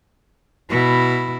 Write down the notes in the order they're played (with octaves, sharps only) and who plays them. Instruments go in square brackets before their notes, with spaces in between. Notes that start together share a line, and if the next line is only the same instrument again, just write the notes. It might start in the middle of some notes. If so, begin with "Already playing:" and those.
[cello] B2 E4